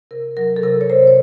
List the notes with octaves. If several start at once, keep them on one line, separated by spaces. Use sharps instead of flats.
C3 A#4
F#3 A#4
A4
C3 A#4
C#5
C3 C5
C#5